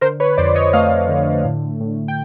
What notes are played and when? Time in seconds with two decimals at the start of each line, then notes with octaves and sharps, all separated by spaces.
0.01 D3 A#4 C5
0.20 B4 C#5
0.37 F2 C5 D5
0.55 C#5 D#5
0.73 A3 D#5 F5
1.09 D3
1.44 A2
1.80 A2
2.08 G5